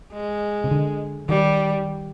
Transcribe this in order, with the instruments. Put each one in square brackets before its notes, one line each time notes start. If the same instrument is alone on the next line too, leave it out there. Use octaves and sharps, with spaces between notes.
[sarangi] G#3
[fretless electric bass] C3
D3
[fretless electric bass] D#3 [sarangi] G3